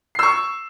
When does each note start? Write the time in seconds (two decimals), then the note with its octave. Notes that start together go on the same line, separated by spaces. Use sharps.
0.15 C7
0.19 E6
0.23 C#6